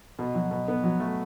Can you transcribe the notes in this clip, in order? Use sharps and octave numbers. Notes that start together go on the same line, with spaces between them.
B2
F#3
B2
B3
F#3
A3